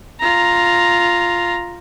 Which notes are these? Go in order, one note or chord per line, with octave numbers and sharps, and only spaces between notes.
F4 A#5